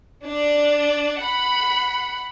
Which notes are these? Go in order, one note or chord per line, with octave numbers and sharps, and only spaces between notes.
D4 D5
F#5 B5